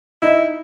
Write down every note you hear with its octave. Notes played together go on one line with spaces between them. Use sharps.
D#4 E4